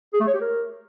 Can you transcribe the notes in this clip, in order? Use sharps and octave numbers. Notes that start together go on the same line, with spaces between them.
G#4
A3
C#5
G4
A#4